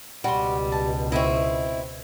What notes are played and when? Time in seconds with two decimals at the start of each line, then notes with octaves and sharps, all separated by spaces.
0.24 C#2 B2 G3 F#4 C6
0.72 A5
1.12 C4 E4 D#5 E5 C#6